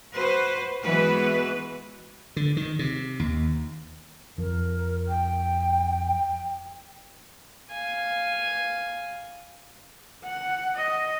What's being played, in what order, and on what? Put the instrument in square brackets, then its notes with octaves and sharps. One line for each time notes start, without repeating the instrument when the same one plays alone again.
[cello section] F#4 B4 C5
E3 G#3 B3 F#4 B4
[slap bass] D3
D#3
C3
D#2
[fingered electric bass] F2 F3 [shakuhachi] A#4
[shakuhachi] G5
[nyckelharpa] F5 G#5
[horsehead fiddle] F#5
D#5